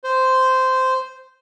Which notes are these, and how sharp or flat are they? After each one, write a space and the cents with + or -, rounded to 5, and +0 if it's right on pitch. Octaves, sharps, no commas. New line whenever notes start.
C5 -10